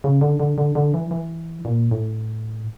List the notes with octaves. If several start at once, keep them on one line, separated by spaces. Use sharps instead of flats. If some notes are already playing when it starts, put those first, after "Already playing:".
C#3
D3
D3
D3
D3
E3
E3
A#2
A2